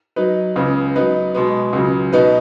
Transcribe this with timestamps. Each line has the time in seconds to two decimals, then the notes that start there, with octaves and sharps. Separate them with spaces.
0.16 F#3 D#4 B4
0.56 C#2 C#3 B3
0.96 F#3 B3 D#4 B4
1.35 B2 G#3 B3
1.73 C#2 C#3 F#3
2.13 B2 B3 D#4 B4